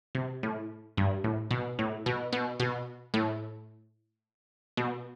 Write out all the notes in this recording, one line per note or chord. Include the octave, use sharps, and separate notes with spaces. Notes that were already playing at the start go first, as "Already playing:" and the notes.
C3
A2
G2
A2
B2
A2
B2
B2
B2
A2
B2